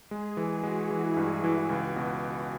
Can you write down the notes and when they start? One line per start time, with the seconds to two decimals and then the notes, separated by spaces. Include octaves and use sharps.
0.11 G#3 G#4
0.37 E3
0.51 F#4
0.63 G#3
0.90 E3 E4
1.16 G2
1.44 E3
1.70 C#2 F#4
1.96 B2